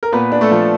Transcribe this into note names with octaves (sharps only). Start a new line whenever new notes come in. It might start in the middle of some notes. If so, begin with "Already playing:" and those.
A#4
A#2 B3 B4
D4
A3 A4
F3